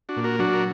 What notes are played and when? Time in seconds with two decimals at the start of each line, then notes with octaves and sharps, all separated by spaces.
0.09 D4 F#4
0.17 A#2
0.24 F#4 A#4
0.39 F#3 D4 F#4
0.53 A#4